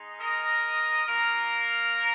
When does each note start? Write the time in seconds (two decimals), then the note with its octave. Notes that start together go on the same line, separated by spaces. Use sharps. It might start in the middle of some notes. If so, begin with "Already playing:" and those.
Already playing: G#3 D#4
0.21 A#4 D#5
1.06 A#3 F4 A#4